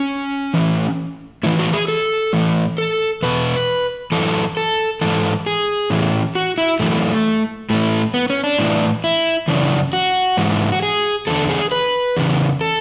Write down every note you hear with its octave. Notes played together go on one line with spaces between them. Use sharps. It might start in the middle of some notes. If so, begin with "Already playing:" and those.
Already playing: C#4
A2 E3
A2 E3 E4
F#4
G#4
A4
A2 E3
A4
E2 B2 B4
F#2 E3 A4
A4
G#2 E3 A4
G#4
A2 E3
F#4
E4
F#2 E3 A3
A2 E3 A3
B3
C#4
D4
A2 E3
E4
F#2 C#3 E3 D4
F#4
G#2 E3
F#4
G#4
E2 D3 A4
G#4
B4
E2 C#3 E3
A4